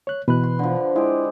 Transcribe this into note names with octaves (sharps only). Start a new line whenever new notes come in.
C#5 F#6
B2 E3 B4 F#6
C6
D3 F3
G#3 E4 G4